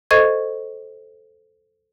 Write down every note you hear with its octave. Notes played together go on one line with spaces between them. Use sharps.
A4 C5 D#5 C#6 G#6